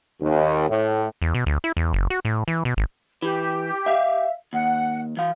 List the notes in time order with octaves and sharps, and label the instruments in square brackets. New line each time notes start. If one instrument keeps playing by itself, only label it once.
[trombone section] D#2
A2
[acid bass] E2
B2
D2
E4
E2
F#1
F#4
A2
E3
B2
G#1
[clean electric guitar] E3 [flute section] G4
[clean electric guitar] E5 F5
[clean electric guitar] D#2 [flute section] F#5
[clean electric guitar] E3 F5